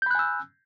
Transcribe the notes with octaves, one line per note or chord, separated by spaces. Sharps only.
G#5 B5 E6 F#6 G6